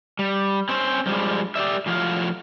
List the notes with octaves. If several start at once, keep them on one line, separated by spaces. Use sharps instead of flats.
G3
C4 C#4 C5
G2 F3 G3 G#3
G4 D5 E5
A2 F3 F#3 F5